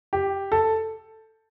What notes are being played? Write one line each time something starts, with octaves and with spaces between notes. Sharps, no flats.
G4
A4